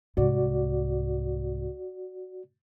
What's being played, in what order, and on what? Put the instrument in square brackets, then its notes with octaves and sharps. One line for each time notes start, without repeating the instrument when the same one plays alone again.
[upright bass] C2 G#2 [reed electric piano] F#4 D5